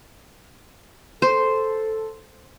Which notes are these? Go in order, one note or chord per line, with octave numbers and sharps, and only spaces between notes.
A4 C5